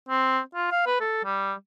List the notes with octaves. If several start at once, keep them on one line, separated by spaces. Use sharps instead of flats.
C4
F4
F5
B4
A4
G3